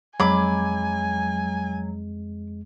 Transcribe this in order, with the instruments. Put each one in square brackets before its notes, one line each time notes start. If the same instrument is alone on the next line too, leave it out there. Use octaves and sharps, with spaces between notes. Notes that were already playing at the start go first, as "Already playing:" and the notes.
[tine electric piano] F2 G#3 [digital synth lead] F#3 [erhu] G#5 [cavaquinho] B5 D6